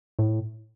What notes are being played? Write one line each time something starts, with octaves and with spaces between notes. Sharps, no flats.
A2